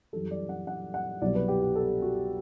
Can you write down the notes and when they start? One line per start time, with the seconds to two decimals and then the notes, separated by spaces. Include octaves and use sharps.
0.13 F#2 E3 G3 A4
0.31 D5
0.49 F#5
0.67 F#5
0.94 F#5
1.22 C2 B2 F#3 D5
1.35 B4
1.48 G4
1.63 G4
1.76 A4
2.02 F#4